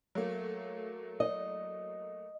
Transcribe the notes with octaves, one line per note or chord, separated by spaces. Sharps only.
F#3 A3 A#3
D#5